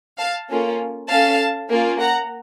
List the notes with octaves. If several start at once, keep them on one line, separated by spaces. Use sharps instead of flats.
F5 A5
A#3 C#4 F4 A4
C#4 A4 F5 A5
A#3 C#4 F4
F#5 A#5